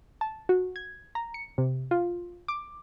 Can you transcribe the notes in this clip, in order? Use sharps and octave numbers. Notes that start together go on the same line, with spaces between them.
A5
F#4
G#6
A#5
C#7
C3
F4
D6